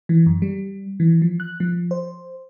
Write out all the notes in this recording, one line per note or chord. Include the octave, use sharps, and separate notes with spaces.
E3
F#2
G3
E3
F3
F#6
F3
C5